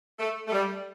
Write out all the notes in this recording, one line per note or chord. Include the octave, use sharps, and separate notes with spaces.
A3
A3
G3